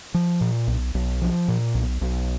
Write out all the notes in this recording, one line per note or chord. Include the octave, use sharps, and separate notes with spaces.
F3
A#2
B1
B1
F3
A#2
B1
B1